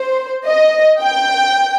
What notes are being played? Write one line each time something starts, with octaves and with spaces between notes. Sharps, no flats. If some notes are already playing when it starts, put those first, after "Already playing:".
Already playing: C5
D#5
G5